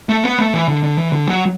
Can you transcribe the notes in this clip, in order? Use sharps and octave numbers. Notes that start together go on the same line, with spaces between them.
A3
B3
A3
E3
D3
D3
E3
D3
F#3